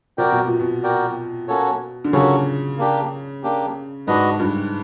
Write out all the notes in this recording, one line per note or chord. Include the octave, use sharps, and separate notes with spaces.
C3 F#4 A#4 D5 G5
B2
A#2
B2
F#4 A#4 D5 G5
A#3 C#4 F#4 A4 C#5
D3
C#3 A#3 C#4 F#4 A4 C#5
A#3 D4 G4
A#3 D4 G4
G#2 D4 F#4 B4 D#5
G2